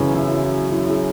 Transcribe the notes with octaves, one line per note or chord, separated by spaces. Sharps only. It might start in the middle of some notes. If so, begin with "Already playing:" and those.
Already playing: F#2 C#3 E3 C#4
E4
E4
G#4